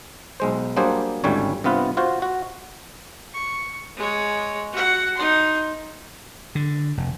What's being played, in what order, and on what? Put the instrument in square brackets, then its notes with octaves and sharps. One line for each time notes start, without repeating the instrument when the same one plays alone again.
[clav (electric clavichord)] B1 G#3 C5
F#3 G3 A#3 D4 G#4 C5
G#1 D2 A2 G3 C#4 C#5
G2 C3 B3 F4 B4
F4 F#4 C5
F#4
[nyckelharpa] C#6
G#3 C#5
F#4 F#5
D#4 C6
[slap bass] D3
F1